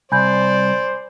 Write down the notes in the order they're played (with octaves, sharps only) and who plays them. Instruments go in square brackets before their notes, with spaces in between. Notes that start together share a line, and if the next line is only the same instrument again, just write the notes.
[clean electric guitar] C2 [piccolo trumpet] C5 [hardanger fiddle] D5 [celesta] G#5 B5 G6